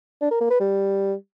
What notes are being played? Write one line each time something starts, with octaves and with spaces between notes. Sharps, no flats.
D4
A#4
A#3
B4
G3